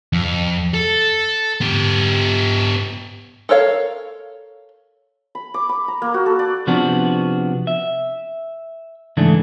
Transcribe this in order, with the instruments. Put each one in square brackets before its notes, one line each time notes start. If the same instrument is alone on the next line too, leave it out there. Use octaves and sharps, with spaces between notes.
[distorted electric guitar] F2
A4
B3 G4
[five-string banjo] A4 A#4 C#5 F5
[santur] B5
D6
B5
A#5
A#3
F#4
A4
D5
[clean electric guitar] C3 F3 B3 D4 F#4
E5
G#2 C#3 E3 A3 D4